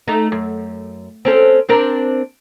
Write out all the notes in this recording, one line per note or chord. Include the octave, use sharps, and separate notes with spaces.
A3 D#4
F#2
C4 C#4 A4
C4 D4 A#4